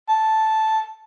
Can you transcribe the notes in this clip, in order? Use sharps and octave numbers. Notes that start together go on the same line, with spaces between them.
A5